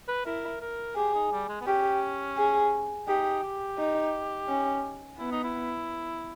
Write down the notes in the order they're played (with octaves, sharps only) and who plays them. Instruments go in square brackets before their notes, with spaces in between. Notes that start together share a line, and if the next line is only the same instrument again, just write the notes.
[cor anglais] B4
[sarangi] E4 [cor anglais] A#4
[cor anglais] A#4
[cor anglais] G4 [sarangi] G#4
[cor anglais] D#4
G3
G#3
B3
[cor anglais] C#4 [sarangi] G4
[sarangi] G#4
[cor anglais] D#4 [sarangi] G4
[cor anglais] G4
[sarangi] D#4
C#4
[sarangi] B3 [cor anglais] E4
[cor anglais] D#4
E4